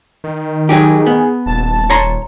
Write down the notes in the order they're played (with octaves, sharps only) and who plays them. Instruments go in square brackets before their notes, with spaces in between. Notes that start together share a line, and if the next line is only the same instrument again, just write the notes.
[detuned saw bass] D#3
[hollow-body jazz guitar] F#3 D#4 G4 [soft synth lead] G#4
[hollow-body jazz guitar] B3
[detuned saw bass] D#1 [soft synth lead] A5
[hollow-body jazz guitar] C#5 A#5 C6